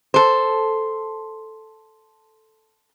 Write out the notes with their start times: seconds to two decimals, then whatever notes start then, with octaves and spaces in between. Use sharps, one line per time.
0.14 A4 C5